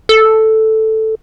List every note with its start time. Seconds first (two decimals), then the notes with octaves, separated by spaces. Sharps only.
0.09 A4